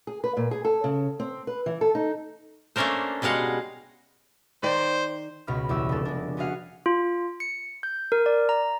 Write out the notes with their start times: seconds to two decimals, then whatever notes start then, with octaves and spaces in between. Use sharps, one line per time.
0.07 G#4
0.24 B4
0.37 A#2
0.51 G#4
0.65 A4
0.84 C#3
1.20 C4
1.47 B4
1.66 E3
1.81 A4
1.95 D#4
2.76 A3 A#3 C#4 D4 A#4 C5
3.22 B2 G3 G#3 F5 F#5
4.63 D#3 C5 D5 G5
5.47 C#2 B2 B5 F6
5.69 E2 G3 G4 C#5 E6
5.89 F1 C#3 D4 A4
6.05 G#3 D4
6.37 B3 C#4 F#4 G#4 F5 F#5
6.86 F4
7.40 C#7
7.83 G6
8.12 A#4
8.26 D5
8.49 A#5